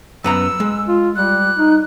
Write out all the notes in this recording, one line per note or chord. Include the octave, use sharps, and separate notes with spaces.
F#2 B3 A#5 E6
G#3
F4
G3 F#6
D#4